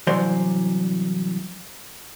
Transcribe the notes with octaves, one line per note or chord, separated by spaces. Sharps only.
C2 E3 F#3 C5 D5 C6